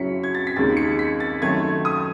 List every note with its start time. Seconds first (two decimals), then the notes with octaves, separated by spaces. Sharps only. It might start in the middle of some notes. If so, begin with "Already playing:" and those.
Already playing: F#2 C#3 F#3 C#4 E4 B6 C#7
0.24 G#6
0.35 A6
0.47 B6
0.56 D#2 C#3 G#3 D#4 A6
0.77 C#7
0.99 B6
1.20 A6
1.42 F#2 D#3 A3 G#6
1.85 D#6